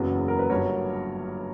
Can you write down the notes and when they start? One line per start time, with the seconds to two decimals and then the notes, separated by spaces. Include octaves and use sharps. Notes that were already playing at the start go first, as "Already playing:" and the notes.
Already playing: F#1 E2 C#3 F#3 B3
0.28 A#4
0.39 B4
0.50 G1 G2 F#3 A#4 C#5